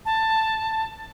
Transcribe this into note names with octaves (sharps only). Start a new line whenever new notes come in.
A5